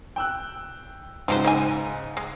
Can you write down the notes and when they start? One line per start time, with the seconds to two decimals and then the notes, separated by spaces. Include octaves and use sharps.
0.16 G5 E6 F#6
1.28 G#2 C#3 F3 F#3 C5
1.44 G#3 D#4 G#5
2.17 G#3